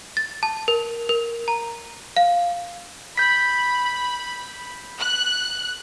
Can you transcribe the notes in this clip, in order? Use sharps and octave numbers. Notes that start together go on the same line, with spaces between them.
A6
A5
A#4
A#4
A#5
F5
B5 G6 B6
F#6